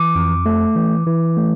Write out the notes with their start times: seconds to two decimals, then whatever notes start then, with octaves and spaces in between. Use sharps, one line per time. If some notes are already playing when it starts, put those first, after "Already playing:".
Already playing: E3 D6
0.15 F2
0.46 A3
0.76 E3
1.06 E3
1.37 A3